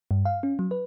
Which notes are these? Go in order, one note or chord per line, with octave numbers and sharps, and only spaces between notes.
G2
F5
C#4
F#3
B4